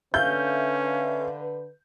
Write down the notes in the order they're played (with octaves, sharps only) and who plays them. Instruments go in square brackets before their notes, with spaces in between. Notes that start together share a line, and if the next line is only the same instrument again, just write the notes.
[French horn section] D3 B4 [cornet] C#4 [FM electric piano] E5 F5 [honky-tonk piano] G6